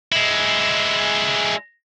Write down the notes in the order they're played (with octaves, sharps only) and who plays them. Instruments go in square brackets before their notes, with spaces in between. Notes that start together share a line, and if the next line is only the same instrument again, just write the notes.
[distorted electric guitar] G#3 E4